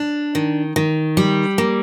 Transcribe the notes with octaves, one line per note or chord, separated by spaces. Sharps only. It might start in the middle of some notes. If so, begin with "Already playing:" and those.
Already playing: D4
D#3
D#3
G3
A#3